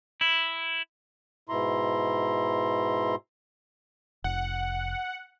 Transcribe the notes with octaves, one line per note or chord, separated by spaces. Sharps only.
E4
G#2 B2 E4 A#5 C6
F1 F#5